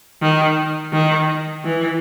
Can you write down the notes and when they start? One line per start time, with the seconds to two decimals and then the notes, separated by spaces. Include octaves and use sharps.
0.22 D#3
0.93 D#3
1.64 E3